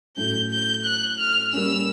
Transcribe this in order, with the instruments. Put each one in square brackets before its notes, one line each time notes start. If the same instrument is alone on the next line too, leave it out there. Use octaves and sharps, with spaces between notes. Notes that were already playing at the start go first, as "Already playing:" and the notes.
[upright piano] A2 F#3 A3 C#4 [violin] G6
[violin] G6
F#6
F6
[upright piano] G3 A#3 C#4 [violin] E6